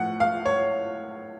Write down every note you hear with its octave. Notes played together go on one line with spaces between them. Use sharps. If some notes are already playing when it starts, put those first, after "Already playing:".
Already playing: A2 F3 F#5
F5
C#5